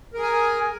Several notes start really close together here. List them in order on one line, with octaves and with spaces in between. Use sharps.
A#4 G#4 G#5